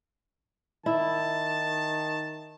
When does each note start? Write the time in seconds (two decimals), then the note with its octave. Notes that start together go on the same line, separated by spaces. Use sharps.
0.86 D#3 E4 A5